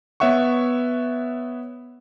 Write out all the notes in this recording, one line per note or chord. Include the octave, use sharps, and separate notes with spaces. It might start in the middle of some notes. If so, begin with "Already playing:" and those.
B3 C#5 E5 F#5 C#6